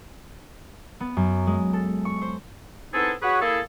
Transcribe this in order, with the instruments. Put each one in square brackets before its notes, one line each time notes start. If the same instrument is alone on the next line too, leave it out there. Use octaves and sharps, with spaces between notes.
[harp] B3
F#2
G#3
A4
C#6
C5
[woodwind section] B3 C4 D#4 E4 G#4 A4
F#4 G#4 B4 C#5
A#3 E4 G#4 A4